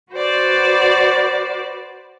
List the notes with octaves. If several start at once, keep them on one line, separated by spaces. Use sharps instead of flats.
F#4 B4 C5 D5